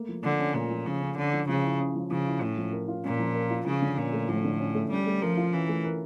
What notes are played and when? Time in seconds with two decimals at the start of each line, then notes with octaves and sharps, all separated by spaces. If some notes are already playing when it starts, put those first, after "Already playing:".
Already playing: A3 A#3
0.09 F3
0.24 D3 F3
0.40 C#4
0.55 A#2 A3
0.71 F3
0.86 C#3 F3
1.02 C#4
1.17 D3 C#4
1.33 F3
1.48 C#3 F3
1.64 E4
1.80 C#4
1.95 F3
2.11 C#3 F3
2.27 E4
2.42 A2 C#4
2.57 F3
2.73 A#4
2.88 F4
3.04 A#2 C#4
3.19 F3
3.35 A#4
3.51 F4
3.66 C#3 F3
3.82 D3
3.97 A#2 C#4
4.13 A3
4.28 A2 F3
4.44 D3
4.60 C#4
4.75 A3
4.91 G3 C#4
5.07 A3
5.22 F3 A#4
5.37 F4
5.53 E3 C#4
5.69 A3
5.84 A#4